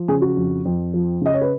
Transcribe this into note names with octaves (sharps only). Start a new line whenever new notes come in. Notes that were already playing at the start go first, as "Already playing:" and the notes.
Already playing: F3
C#3 G#4
F#4
F2
F2
F3
C#3 D#5
C#5
B4